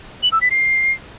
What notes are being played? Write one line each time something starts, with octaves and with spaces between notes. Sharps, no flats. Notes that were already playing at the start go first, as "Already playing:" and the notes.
F#7
E6
B6
C7